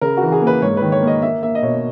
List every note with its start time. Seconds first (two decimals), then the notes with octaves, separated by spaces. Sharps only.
0.01 C#3 A#4
0.17 F#4
0.22 E3
0.32 G#4
0.42 A#3
0.47 B4
0.62 G#2 C#5
0.77 D#3 B4
0.92 C#5
1.03 A#3 D#5
1.22 A#3 E5
1.43 A#3 E5
1.55 D#5
1.63 B2 C#5